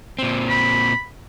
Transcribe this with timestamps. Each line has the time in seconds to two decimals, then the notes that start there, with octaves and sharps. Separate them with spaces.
0.19 A#2 C4
0.49 B5